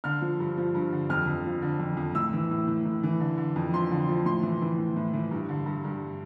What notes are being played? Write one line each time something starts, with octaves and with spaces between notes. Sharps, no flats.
D3 F6
F3
G2
F3
G2
D3
F2 F6
F2
F3
D3
F2
F2
A2 E6
E3
A2
A2
A2
E3
D3
D3
F2
F3 C6
D3
F3
A2 C6
E3
E3
A2
A2
E3
G2
D3
G2
G2